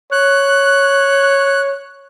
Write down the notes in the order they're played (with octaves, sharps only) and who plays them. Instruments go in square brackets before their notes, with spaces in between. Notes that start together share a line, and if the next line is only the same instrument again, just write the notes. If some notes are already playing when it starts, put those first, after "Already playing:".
[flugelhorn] C#5 [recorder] F#6